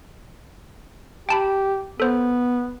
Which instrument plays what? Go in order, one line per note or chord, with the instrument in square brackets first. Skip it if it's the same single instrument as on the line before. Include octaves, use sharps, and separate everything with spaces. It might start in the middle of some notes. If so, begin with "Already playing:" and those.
[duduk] G4 [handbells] G5 A5 B5
[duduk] B3 [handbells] A4 C5